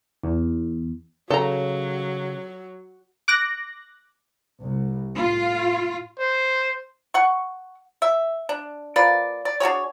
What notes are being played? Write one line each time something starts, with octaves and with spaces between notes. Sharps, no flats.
E2
C#3 F#3 A4 A#5
D6 F#6 A#6
C2
A2 F4
C5
F#5 C#6
E5
D4
F3 A#3 B4 D5
D5
D4 F#4 G#4 C#5